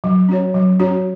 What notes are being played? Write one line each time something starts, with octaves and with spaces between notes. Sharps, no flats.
F#3
C#4 F#4 C#5
F#3
C#4 F#4 C#5